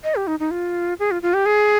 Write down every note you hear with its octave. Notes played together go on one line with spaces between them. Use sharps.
D#5
G4
D#4
D#4
F4
G#4
F4
F4
G4
G#4